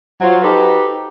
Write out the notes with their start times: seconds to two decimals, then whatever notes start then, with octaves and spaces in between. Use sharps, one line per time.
0.21 F#3 F4 C5
0.42 D#4 F#4 G4 A4 B4 C5